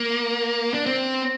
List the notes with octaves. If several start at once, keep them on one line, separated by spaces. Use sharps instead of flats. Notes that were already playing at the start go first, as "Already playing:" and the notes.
Already playing: A#3
D4
C4